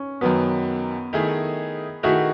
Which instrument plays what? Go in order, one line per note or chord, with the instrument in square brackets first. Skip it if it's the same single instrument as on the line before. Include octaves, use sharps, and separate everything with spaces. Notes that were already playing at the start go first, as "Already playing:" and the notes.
Already playing: [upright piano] C#4
[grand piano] F#2 D#3 F#3 [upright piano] B3
[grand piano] D#3 A3 E4 G#4
[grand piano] D#3 A3 E4 G#4 [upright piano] F#4